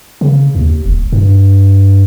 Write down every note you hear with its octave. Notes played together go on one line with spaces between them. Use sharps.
C#3
D#2
D#1
G2